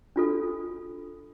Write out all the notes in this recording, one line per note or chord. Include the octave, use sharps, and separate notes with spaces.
D4 F4 A4